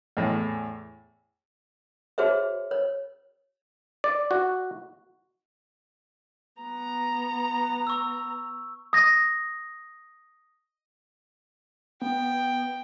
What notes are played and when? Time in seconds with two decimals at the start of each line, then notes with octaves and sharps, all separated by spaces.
0.17 E2 A2
2.18 F#4 G#4 C5 C#5 E5
2.71 C#5
4.04 D5
4.31 F#4
6.61 B3 A#5
7.87 C#6 E6
8.93 D#6 A#6
12.02 B3 G5